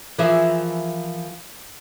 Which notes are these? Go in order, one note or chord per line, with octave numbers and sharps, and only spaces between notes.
E3 F3 E4 G#4 A#4 E5